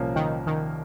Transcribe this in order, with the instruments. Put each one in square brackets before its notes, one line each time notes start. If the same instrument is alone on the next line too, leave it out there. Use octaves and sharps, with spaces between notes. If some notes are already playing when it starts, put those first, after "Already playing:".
Already playing: [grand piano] C2 A#2 F3 A#3 C#4
[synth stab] D#3
D#3